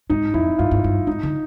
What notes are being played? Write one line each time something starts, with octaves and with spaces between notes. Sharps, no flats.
G#2 D#4
F2 E4
G2 F4
G#2
G2
G#2 D#4
D3